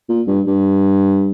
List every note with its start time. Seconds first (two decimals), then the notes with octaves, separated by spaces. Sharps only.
0.09 A#2
0.27 G2
0.47 G2